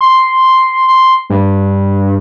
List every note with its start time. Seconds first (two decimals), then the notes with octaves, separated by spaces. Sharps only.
0.01 C6
0.88 C6
1.30 G2